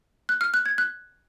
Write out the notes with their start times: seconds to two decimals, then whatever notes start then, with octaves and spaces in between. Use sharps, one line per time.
0.29 F#6
0.41 F6
0.54 F#6
0.66 G#6
0.78 F#6